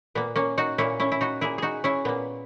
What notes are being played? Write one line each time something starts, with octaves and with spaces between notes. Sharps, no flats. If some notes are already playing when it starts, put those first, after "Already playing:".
A#2 A#3 B3
A#3 C#4
D#4 F#4
A#2 A#3 C#4 E4
C#4 E4
E4
D#4 F#4
A#2 A#3 E4 G#4
D#4 F#4 G#4
C#4 E4
A#2 A#3 B3